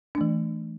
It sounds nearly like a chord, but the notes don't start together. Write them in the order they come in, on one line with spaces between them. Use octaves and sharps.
D4 A3 E3